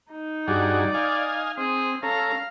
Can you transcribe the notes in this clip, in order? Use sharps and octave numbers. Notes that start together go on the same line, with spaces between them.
D#4
G2 F#4 G#4 D5
D#5 F5 G#5
C4 G#4
C#4 A4 F5 A#5